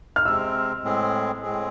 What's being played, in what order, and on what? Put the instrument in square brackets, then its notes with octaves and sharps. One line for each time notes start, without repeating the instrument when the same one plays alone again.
[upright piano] F6
[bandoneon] C3 G#3 C4 [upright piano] E6
[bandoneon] A2 G#3 C4 G#4
A2 G#3 C4 G#4